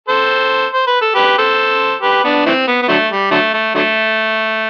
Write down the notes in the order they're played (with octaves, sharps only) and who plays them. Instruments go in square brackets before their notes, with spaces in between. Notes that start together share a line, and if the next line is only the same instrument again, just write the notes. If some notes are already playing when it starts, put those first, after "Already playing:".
[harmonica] A4 C5
C5
B4
A4
G4 B4
A4 C5
G4 B4
B3 D4
E3 A3 C4
B3
B3
D3 F#3 A3
G3
D3 F#3 A3
A3
D3 F#3 A3